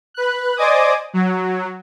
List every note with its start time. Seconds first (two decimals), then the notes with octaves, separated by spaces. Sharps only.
0.14 B4 F#6
0.57 C5 D5 D#5 G#5 D6 D#6
1.14 F#3